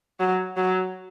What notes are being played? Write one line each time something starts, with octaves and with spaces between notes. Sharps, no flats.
F#3
F#3